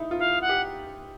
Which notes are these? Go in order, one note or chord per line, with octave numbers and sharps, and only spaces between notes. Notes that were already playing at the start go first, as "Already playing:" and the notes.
Already playing: D#4 E4
F4
E4 F5
F#5
G4